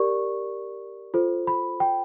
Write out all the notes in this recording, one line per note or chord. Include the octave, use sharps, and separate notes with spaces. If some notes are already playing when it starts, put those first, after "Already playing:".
Already playing: G4 A#4 D5 C#6
F4 A4 C5
B5
G5